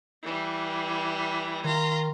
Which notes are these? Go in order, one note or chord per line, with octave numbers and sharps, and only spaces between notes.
E3 G3
D#3 F4 A#5